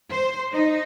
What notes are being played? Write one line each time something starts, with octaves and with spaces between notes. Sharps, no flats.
C5
D#4